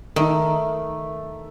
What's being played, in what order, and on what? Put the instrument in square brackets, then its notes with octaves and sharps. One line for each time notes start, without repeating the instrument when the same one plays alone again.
[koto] D#3 [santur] A3 [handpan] D#4 A#4